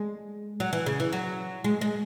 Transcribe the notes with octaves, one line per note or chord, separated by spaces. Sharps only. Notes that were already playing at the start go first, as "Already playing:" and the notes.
Already playing: G#3
F#3
E3
C#3
E3
F#3
G#3
G#3